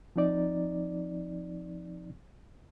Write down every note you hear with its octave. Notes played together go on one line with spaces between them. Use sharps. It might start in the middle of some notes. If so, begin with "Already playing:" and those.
F3 C4 D#4 D5